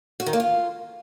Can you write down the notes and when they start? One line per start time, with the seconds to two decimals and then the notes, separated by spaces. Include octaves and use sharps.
0.20 F#4
0.26 D#3
0.33 A#3
0.40 F4